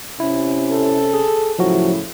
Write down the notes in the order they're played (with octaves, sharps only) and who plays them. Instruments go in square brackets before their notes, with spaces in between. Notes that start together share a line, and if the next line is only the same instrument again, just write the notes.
[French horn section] C3 C#4 [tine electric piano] E4
[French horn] A4
[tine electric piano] G#4
[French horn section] A2 C#3 E4 [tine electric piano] F3 F#3 F#4